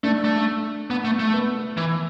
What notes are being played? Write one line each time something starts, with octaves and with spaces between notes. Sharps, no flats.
A3 D4
A3
B3
A3
A3
B3
E3